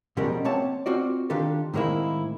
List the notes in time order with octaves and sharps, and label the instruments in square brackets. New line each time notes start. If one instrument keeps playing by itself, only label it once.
[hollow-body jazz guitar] B2 F3 G3 G#3 C#4 A#4
A#3 C4 C#5 F#5 A5
C4 F4 F#4 D5
D#3 D4 F4 G4 A4
A2 D#3 G#3 A#3 C4 E4